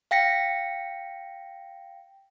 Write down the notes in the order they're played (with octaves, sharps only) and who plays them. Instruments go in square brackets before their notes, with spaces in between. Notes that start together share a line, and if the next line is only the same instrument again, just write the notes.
[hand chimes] F5 G5 A#6 B6 C#7